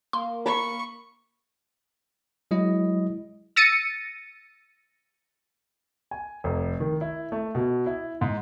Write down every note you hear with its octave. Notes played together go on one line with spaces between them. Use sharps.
A#3 C6
B5 C#6
F#3 G#3 E4 D#5
E6 A6 A#6 C#7 D#7
G#5
F1
D#3
E4
A3
B2
E4
G#2